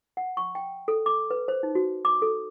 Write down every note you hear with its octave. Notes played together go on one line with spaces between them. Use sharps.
F#5
C#6
G5
A4
D6
B4
C5
D#4
F#4
D6
A4